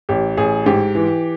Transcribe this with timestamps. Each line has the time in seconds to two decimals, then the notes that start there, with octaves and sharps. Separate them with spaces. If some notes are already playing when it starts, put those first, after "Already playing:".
0.09 A1 G4
0.37 A1 G#4
0.66 G#2 G4
0.95 E3